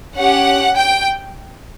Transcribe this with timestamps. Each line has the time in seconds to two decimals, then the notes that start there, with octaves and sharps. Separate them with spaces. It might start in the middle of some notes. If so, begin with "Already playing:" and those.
0.16 C#4 G4 F#5
0.77 G5